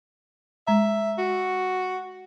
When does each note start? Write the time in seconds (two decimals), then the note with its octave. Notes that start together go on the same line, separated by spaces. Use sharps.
0.67 G#3 E5 A#5
1.19 F#4